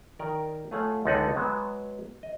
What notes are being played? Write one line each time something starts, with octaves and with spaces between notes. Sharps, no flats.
D#3 A#4 D5
A3 F4 G#4 C#5 F5 F#5
C#2 D3 D#4 A4 F#5 G#5
F#3 G#3 B3 F#4
D#5